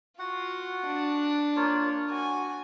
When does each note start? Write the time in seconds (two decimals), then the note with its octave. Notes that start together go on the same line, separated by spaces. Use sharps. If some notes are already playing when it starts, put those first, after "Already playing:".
0.19 F4 F#4 F#5
0.85 D4
1.56 A#3 F4 C#5
2.10 F#4 G#5